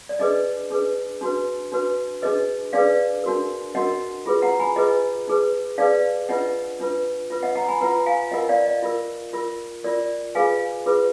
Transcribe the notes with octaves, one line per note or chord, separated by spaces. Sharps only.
D5
D4 G#4 B4 D#5
D4 G#4 B4
D4 F#4 B4
D4 F#4 B4
D4 G#4 B4 D#5
D4 G#4 B4 D5 F5
D4 F#4 A#4
D4 F#4 A#4 D#5 F#5
F4 G#4 B4
F#5 A#5
G#5 B5
F4 G#4 B4 D#5
D#4 G#4 B4
D#4 G#4 B4 D5 F5
D4 F4 B4 D#5 F#5
D4 F4 B4
F4 B4
D#5 F#5
F#5 A#5
G#5 B5
F4 B4 F#5 A#5
F5 G#5
F4 A#4 D#5 F#5
D5 F5
D#5
F4 A#4
F4 A#4
F4 A#4 D5
F4 G#4 B4 F5 G#5
F4 G#4 B4